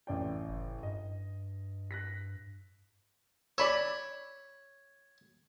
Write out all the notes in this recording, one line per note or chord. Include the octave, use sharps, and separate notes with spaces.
A1 D5 G5
F#1
G2 D#5
F#6 A#6 B6
C#5 D5 B5 E6